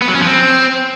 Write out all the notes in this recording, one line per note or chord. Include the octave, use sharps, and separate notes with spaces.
B3
F#3
C#4
F3
C4